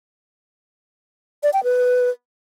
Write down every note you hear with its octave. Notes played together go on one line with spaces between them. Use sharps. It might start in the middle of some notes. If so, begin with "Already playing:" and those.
D5
G5
B4